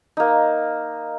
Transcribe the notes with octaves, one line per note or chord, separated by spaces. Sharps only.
A#3 D#4